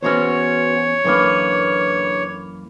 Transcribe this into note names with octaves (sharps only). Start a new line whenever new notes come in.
E2 B3 C#4 F#4 C5 C#5
F#2 D3 E3 A#3 B4